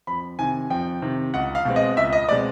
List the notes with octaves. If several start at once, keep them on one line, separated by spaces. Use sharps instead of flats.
F2 B5
C3 D#3 G#5
F2 G5
C3 D#3
C#2 F#5
F5
B2 G#3 C4
D#5
C#2 E5
D#5
B2 G#3 C4 D5